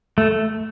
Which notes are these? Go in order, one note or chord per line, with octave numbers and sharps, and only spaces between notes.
A3